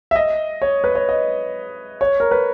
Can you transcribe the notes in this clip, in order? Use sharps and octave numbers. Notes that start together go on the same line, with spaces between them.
E5
D#5
C#5
B4
C#5
D#5
C#5
A#4
B4